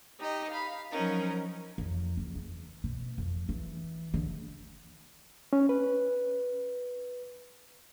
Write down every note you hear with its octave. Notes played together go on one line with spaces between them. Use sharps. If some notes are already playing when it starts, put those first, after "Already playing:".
D#4 G4 D#5
F5 B5
F3 F#3 C#4 D#4 A#4
F2
F#1
E2
B2
F2
E3
D3
C#4
B4